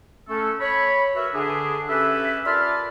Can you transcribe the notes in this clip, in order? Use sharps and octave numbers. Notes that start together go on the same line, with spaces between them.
A3 C#4 A4
C#5 B5
F#4 A#4 B4 E5
D3 D4 G#4
C#4 G4 A4 B4 E5
F4 A#4 D5 A5 B5 F6